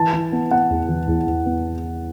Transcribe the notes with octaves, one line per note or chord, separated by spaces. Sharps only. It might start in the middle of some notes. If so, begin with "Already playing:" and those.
Already playing: E3 A5
E3
B3
B3 F#5
E2
E3
E2
E2
B3